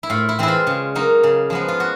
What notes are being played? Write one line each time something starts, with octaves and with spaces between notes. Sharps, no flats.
E4
A2 F4
E4
E3 G#3 C4 E4
F4
C#3
F#3 A#3 D#4
C#3
F3 G#3 B3
F4
F#4